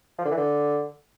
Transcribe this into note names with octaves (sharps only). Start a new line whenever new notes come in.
F3
D3
E3
D3